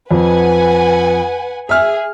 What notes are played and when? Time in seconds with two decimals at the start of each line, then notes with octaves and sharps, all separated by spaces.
0.11 F2 B4 F#5 G#5
1.69 G#4 E5 F6